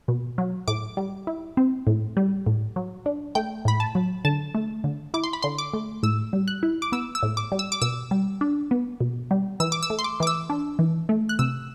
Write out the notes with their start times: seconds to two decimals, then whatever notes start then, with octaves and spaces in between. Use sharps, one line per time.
0.08 B2
0.38 F#3
0.68 A2 D6
0.97 G3
1.27 E4
1.57 C4
1.87 A2
2.17 G3
2.46 A2
2.76 F#3
3.06 D4
3.35 A3 G5
3.65 A2 B5
3.80 A5
3.95 F#3
4.25 D3 A5
4.55 A3
4.84 D3
5.14 E4 D6
5.24 C6
5.33 B5
5.42 D3 C6
5.58 D6
5.74 A3
6.03 A2 E6
6.33 G3
6.48 F#6
6.63 E4
6.82 D6
6.92 B3 E6
7.15 E6
7.23 A2
7.37 D6
7.52 G3
7.59 E6
7.72 D6
7.82 B2 E6
8.11 G3
8.41 D4
8.71 B3
9.01 B2
9.31 G3
9.60 E3 E6
9.72 D6
9.83 E6
9.90 A3
9.99 C6
10.04 D6
10.20 E3 D6
10.27 E6
10.50 D4
10.79 E3
11.09 A3
11.29 F#6
11.39 C3 E6